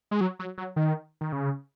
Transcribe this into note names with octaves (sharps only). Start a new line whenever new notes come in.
G#3
F#3
F#3
F#3
D#3
D#3
C#3